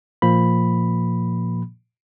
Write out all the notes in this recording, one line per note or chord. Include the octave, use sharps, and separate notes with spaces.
A#2 F3 A#3 B5